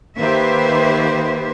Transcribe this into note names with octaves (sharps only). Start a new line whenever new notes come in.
D#3 A#3 G4 B4 C5 E5